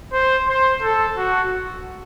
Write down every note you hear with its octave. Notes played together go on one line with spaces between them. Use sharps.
C5
C5
A4
F#4